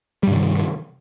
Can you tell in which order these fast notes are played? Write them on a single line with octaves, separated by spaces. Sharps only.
G3 G2 C3 D#3